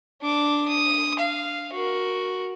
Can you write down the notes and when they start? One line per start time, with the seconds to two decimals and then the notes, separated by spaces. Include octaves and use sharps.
0.22 D4 D6
0.68 D#6
1.19 F5
1.73 F#4 A#4